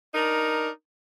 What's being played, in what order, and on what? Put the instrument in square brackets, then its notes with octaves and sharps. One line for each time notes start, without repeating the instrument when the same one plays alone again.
[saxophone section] D4 D#4 A#4